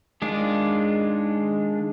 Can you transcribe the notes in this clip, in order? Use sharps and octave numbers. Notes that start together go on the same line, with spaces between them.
D#3 G#3 D4 F4